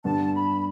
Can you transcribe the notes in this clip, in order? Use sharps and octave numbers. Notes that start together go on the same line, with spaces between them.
G2 D3 G3 B3 D4 A5
B5